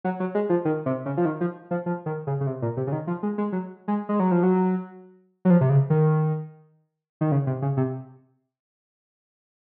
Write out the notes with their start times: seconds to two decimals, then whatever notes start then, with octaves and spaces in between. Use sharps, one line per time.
0.04 F#3
0.20 F#3
0.35 G#3
0.50 F3
0.65 D#3
0.86 C3
1.06 C#3
1.17 F3
1.25 D#3
1.41 F3
1.71 F3
1.86 F3
2.06 D#3
2.27 C#3
2.41 C#3
2.47 C3
2.62 A#2
2.77 C3
2.87 C#3
2.92 D#3
3.07 F3
3.23 G#3
3.38 G#3
3.52 F#3
3.88 G#3
4.09 G#3
4.20 F#3
4.31 F3
4.43 F#3
5.45 F#3
5.50 F3
5.61 C3
5.70 C#3
5.90 D#3
7.21 D#3
7.32 C#3
7.47 C3
7.62 C#3
7.77 C3